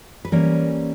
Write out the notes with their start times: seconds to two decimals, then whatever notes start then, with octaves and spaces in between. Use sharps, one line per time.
0.25 B4
0.32 E3 G3 A#3 C#4 A#4